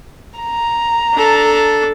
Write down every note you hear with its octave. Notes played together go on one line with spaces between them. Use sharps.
A#5
D4 A4